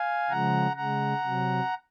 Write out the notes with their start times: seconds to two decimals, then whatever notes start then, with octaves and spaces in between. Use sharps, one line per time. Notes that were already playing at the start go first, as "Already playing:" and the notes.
Already playing: F5 G#5
0.30 C#3 F3 G#3 F#5 A#5
0.76 C#3 G#3 F#5 A#5
1.24 C3 F#3